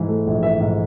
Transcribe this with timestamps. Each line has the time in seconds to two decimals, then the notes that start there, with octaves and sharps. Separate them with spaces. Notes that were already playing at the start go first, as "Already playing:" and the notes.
Already playing: G#2 E3
0.08 A3
0.27 A#1
0.43 E3 E5
0.60 G#2